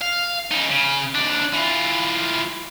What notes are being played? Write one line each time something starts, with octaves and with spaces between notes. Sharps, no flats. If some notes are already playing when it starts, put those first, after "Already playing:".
F5
C#3 D#4
C#3
D#2 D4
E3 F4